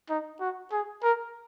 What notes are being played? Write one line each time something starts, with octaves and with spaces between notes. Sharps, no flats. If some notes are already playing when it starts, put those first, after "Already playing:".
D#4
F#4
G#4
A#4